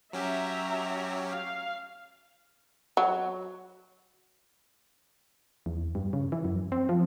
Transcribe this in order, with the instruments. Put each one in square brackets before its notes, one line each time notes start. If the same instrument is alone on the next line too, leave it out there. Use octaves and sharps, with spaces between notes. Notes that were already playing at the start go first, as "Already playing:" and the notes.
[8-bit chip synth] F#3 C#4 G4 [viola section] E5 A#5
[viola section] F5
[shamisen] F#3
[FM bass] E2
G2
C#3
E3
F#2
C4
F3